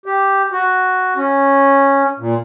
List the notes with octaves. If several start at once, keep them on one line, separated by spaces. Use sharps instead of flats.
G4
F#4
C#4
A#2